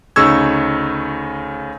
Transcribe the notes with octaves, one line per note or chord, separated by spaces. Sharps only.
D2 C#3 D#4 C#6 E6 G#6